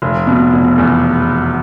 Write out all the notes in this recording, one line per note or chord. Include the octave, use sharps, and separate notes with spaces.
F1
B2
F1
E2